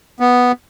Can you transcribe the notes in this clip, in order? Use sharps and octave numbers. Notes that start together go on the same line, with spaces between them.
B3